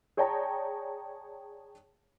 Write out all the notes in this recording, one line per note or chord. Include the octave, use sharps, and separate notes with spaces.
G#4 C#5 D5 G5 A5 A#5